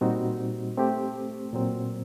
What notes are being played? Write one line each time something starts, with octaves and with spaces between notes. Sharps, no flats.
A#2 G3 C4 D#4 F#4
A3 C4 G4
A#2 F#3 C4